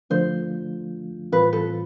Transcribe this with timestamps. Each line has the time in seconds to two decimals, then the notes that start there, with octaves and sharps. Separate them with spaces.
0.10 D3 F3 A3 D4 F4 C5
1.32 A2 E3 G3 C4 F4 B4
1.53 A4